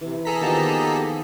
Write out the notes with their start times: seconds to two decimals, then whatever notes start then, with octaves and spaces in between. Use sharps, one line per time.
0.01 C3 E3
0.25 G#4 A4 A#5 B6
0.41 D#3 F3 A#3 B3 G4 D#5 A5 A#5